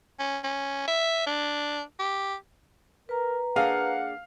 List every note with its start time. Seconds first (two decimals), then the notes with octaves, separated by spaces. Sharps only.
0.20 C#4
0.44 C#4
0.88 E5
1.27 D4
2.00 G4
3.09 A#4 B4 A#5
3.56 A#3 D4 G#4 F5 F#5